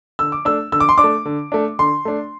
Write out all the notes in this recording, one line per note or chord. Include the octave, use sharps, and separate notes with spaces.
D3 E6
D6
A3 D4 E6
D3 E6
D6
C6
D4 D6
A3
D3
A3 D4
D3 C6
A3 D4